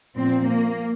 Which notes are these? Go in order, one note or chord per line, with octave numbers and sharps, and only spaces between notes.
A#2 F3 C4
A#3